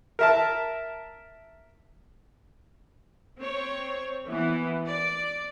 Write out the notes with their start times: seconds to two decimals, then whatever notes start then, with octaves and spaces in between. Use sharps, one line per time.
0.19 A#4 E5 A5
3.40 C4 C#5
4.29 E3 B3
4.85 D5